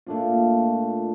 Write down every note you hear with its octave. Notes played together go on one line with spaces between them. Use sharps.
A#2 A3 D4 F4